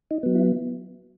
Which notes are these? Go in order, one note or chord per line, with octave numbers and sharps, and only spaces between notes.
D#4
F#3 B3
E4